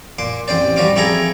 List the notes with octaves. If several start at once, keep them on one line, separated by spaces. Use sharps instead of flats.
A#2 C6 D6
A1 C4 C5 D5
A1 G3 F#4 D5 F5 D6
F3 C4 E4 G#4 A4 A#5